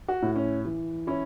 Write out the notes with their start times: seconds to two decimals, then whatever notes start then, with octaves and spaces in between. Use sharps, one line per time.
0.08 F#4
0.22 A2
0.36 C#4
0.65 E3
1.07 C#4 E4